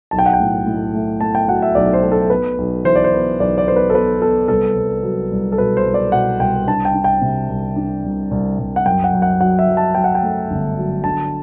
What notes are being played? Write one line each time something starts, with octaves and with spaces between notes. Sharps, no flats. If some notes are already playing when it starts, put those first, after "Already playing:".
B1 A5
G5
F#5
G5
A2
A2
A3
A3 A5
G5
F#3 F#5
E5
B1 D5
C5
A3
A4
B3 B4
B1
E3 C5
D5
C5
B3
B1 D5
D5
B3 C5
B4
A4
B3 B4
B3 A4
C2 A4
C2
F#3
C2
A4
B2 B4
C5
C2
D5
B2 F#5
C2 G5
D4 A5
G5
D4
G5
C3
C2
D4
C2
C2
C2
F#5
F#2 G5
F#5
F#2
F#5
F#3 F#5
E5
F#3
A5
F#3 G5
F#5
G5
A3
G1
F#3
D3 A5